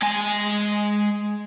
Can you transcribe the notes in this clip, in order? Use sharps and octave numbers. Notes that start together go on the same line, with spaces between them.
G#3 G#5